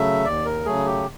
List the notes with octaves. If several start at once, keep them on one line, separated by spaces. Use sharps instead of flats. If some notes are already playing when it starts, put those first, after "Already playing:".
Already playing: C#3 F#3 A3 E5
D#2 D5
A#4
C#3 F#3 A3 G#4
G4